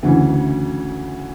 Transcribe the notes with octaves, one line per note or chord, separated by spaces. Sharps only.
D2 C#3 E3